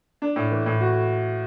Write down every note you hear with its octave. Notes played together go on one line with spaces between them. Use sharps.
D4
A2
E3
A2
F#4